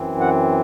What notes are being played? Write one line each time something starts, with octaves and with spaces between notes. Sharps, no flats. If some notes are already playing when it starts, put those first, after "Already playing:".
Already playing: F#2 E3 C4
F#5